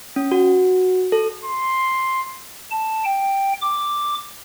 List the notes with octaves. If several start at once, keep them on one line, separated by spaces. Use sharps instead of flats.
C#4
F#4
A4
C6
A5
G5
D6